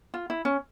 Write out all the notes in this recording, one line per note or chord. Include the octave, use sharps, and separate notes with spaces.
F4
E4
C#4